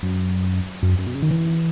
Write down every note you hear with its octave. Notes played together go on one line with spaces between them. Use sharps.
F#2
F#2
F#2
B2
C#3
D#3
E3